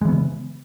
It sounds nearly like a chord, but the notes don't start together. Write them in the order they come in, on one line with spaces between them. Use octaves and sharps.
G#3 E3 B3 C#3